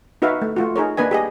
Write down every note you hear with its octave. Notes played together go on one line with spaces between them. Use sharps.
D#4 F#4 B4 E5 F5
A3
A3 F4 F#4
D#4 G#4 A#4 C#5
A#3 D4 B4 D#5 G#5
G4 G#4 D#5